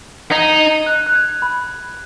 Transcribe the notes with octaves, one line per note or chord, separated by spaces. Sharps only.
D#4 G#6
F#6
F#6
G#6
B5